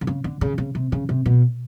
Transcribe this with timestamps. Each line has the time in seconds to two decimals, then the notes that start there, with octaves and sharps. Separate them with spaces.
0.01 D3
0.07 C#3
0.24 D3
0.41 C#3
0.58 C#3
0.75 C3
0.92 C#3
1.09 C3
1.26 B2